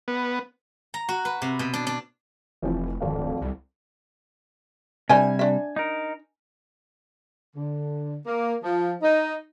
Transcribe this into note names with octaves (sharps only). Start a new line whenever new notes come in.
B3
A#5
F#4
B4
C3
B2
D4
D4
F1 E3 F3 C4
D1 G#1 F2 F5
C2
C3 G3 D4 C5 E5 G#5
D4 E5
D#4 A#4
D3
A#3
F3
D#4